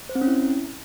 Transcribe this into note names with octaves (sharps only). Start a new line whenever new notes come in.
C5
C4
C#4
E4